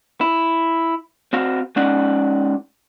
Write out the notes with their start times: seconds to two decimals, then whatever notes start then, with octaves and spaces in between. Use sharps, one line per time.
0.21 E4
1.33 C4 F#4 F5
1.76 G#3 C#4 D#4 D5 F#5